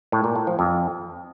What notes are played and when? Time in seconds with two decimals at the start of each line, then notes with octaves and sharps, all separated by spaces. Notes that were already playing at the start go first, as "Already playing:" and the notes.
0.12 A2
0.24 A#2
0.36 A2
0.47 F3
0.59 F2